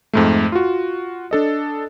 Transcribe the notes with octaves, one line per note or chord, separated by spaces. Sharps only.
F2 G#2 A3
F4 F#4
D4 A4 D#5